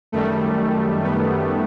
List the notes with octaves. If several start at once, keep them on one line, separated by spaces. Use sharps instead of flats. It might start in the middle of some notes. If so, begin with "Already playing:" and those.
F#2 D#3 G3 A3
B3